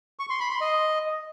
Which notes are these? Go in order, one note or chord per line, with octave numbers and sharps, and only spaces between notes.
C#6
C6
B5
C6
D#5